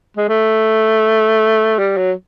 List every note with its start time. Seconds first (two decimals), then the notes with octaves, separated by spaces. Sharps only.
0.17 G#3
0.29 A3
1.78 G3
1.97 F#3